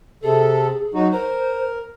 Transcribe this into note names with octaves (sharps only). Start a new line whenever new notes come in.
C3 G#4 A4
F#3 D#4 F#4
A#4 C5